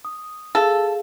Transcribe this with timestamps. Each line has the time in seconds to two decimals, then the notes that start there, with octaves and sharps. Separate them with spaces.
0.05 D#6
0.55 G#4 A4 F5